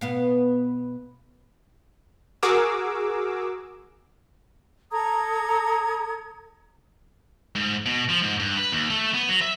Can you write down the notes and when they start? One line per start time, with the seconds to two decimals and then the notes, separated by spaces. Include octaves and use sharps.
0.01 B2 B3 F5
2.43 F#4 G#4 A#4 D6 E6
4.91 A4 A#5 D#6 G#6
7.55 G#2
7.86 B2
8.09 F3
8.22 G#2
8.40 G2
8.58 B4
8.72 D#2
8.90 A3
9.14 B3
9.29 F#3
9.42 E5